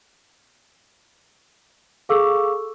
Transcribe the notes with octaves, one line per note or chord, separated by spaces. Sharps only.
G#4 A4 F5 C#6 D6 E6